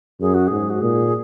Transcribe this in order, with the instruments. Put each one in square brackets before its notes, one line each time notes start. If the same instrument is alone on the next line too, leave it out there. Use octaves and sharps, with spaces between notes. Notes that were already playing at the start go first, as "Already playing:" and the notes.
[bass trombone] F#2 [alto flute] G#4
[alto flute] F#4
[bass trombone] G#2 [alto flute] G#4
[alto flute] F#4
[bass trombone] A#2 [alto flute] G#4